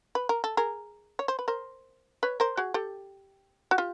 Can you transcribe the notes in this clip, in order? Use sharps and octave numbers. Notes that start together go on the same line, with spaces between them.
B4
A#4
A4
G#4 A#4
C#5
C5
B4
A#4 C5
B4 C#5
A#4 C5
F#4 G#4
G4 A4
F#4
F4 G4